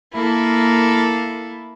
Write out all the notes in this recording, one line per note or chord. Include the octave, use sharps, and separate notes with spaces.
A#3 E4 A4